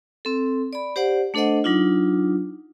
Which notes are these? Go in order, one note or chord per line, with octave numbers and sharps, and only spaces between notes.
C4 A4
D5 B5
G4 C5 D5 F#5
A3 D4 A4 C5 D#5 F#5
F#3 D4 D#4 F4